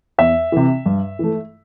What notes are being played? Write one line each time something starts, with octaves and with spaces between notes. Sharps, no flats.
E2 E5
C3 E3
G2
E3 A3